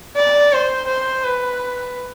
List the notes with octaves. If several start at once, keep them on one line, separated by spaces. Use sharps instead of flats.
D5
C5
C5
B4